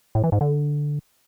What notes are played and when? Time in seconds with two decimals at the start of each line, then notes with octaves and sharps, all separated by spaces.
0.15 A2
0.24 E3
0.32 G#2
0.41 D3